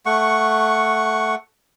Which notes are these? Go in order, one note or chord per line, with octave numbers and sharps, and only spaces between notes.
A3 F#5 C#6